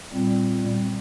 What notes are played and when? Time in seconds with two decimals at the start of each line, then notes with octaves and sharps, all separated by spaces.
0.13 A#2 G3 C4